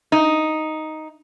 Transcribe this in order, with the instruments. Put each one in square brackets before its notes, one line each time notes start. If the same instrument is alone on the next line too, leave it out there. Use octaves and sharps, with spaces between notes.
[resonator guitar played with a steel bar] D#4